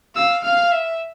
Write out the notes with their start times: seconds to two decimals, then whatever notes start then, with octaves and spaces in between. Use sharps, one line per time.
0.15 F5 E6
0.44 F5 F6
0.72 E5